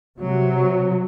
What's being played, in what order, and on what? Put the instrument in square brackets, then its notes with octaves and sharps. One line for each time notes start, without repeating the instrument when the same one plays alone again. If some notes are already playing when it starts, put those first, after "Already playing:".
[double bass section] C3 F#3